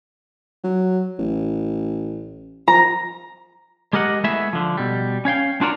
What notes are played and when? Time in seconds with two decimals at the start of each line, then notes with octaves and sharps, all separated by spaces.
0.64 F#3
1.19 A1
2.68 F3 A#5
3.93 G#3 G4 A#4 D#5 F#5
4.24 G#3 A3 B3 E4 G#4 E5
4.53 D3 F3
4.77 B2 G3
5.25 C#4 C#5 F5 G5
5.61 D4 F4 F#4 A#4 D5 A#5